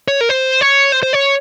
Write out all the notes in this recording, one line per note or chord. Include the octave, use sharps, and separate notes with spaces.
C#5
A#4
C5
C#5
C5
C5
C#5